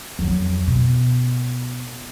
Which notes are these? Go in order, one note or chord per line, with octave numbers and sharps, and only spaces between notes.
F2 F#3
B2